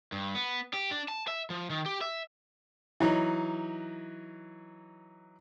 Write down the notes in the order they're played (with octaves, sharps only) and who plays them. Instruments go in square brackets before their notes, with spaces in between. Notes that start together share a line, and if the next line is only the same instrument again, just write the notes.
[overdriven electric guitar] G2
B3
G4
D4
A5
E5
F3
D#3
G4
E5
[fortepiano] E3 F#3 D#4